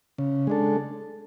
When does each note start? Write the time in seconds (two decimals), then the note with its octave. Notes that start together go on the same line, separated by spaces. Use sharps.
0.18 C#3
0.47 G#3 D4 A4